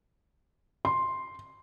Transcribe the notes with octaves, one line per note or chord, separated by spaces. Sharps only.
C6